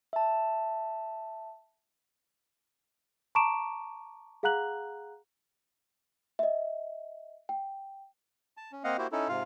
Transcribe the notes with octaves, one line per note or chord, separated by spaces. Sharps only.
E5 A5
A5 A#5 C#6 D6 D7 E7
G#4 F5 F#5 A#5 F#6 F#7
D#5 E5
G5
A5
C#4
A#3 C4 D#5 F5 F#5
A#3 E4 F#4 G4 C5
C#4 D#4 E4 A4
G#2 C3 F4 F5